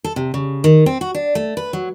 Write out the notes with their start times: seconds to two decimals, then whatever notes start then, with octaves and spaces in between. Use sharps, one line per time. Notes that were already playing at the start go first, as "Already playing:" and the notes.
0.04 A4
0.16 C3
0.34 C#3
0.64 D#3
0.86 C4
1.01 F#4
1.15 D4
1.35 A3
1.57 B4
1.73 F#3